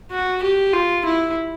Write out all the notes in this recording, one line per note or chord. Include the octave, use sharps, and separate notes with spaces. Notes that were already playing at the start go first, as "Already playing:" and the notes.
F#4
G4
F4
E4